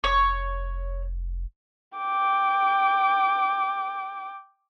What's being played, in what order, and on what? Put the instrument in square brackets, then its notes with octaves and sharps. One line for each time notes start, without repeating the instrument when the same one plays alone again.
[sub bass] F1 [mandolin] C#5
[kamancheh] G5 D6